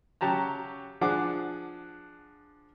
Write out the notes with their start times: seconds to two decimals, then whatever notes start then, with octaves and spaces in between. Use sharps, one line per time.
0.21 C#3 F#3 G4 A5 A#5
1.01 F3 D4 G#4 F#5 D6